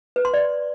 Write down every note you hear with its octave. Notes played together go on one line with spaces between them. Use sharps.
B4
C6
D5